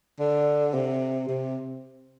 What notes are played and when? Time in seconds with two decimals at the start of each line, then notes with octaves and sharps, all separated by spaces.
0.20 D3
0.74 C3
1.28 C3